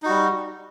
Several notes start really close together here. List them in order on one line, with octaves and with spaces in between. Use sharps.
D#4 F#4 G3